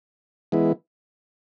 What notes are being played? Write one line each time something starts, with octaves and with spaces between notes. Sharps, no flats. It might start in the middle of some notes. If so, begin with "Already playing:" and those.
E3 G#3 B3 E4